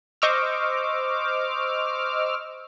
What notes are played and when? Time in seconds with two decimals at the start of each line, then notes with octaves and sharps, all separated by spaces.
0.22 C5 D#5 C#6 D6 E6 F6